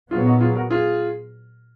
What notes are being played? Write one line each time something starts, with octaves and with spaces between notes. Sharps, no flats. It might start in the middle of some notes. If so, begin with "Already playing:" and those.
A#2 F#3 B3 F4 G#4
D#4 F#4
F4 G#4
F#4 A#4
F4 G#4